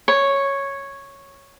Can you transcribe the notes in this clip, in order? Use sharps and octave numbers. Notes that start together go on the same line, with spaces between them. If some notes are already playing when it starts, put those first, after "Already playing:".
C#5